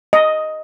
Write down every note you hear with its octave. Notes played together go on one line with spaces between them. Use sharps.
D#5